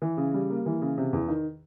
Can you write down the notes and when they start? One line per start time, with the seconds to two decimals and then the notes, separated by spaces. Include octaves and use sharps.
0.02 E3
0.17 C#3
0.34 G3
0.50 A#3
0.66 E3
0.81 C#3
0.98 C3
1.13 E2
1.28 D#3